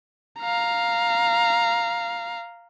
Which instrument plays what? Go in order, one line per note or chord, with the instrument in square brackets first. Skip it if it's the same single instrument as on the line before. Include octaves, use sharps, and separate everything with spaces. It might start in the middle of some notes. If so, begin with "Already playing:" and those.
[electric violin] F5 A#5